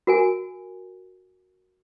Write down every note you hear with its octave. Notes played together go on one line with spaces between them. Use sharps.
F#4 A#4 G#5